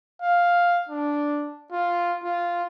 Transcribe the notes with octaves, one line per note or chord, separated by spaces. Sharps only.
F5
D4
F4
F4